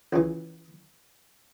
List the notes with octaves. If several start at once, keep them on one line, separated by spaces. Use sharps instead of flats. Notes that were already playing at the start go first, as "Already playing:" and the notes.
C#2 C#3 E3